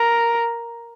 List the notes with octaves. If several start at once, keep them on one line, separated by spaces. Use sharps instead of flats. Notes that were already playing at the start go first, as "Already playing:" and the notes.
Already playing: A#4